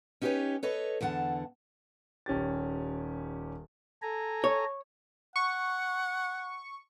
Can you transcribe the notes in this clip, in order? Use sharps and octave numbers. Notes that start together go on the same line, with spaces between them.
C#4 D#4 G4 G#4 B4 C#5
A4 B4 C#5 D#5
E2 D3 F#5 A5
D#1 C#4 G4 A6
A4 G#5 A#5
C#5
F#5 C#6